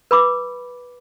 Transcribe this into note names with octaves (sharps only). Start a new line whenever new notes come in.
B4 B5 D6